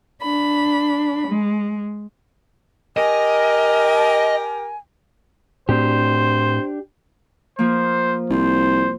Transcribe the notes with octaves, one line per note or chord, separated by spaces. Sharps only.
D4 B5
G#3
G4 A#4 D#5 G#5
A2 C4 D4 G4 C5
F3 A#3 C5
C2 C5